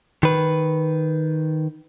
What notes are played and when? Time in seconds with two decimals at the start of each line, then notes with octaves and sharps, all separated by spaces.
0.23 D#3 B4